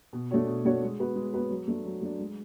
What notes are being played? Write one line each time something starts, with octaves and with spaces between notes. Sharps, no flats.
B2
A3 D4 F#4 C#5
B2
A3 D4 F#4 C#5
G#3
B3 F#4 B4
G#3
B3 F#4 B4
F#3
A3 D4
F#3
A3 D4
G#3